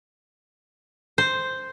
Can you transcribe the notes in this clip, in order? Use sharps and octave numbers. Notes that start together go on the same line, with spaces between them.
C5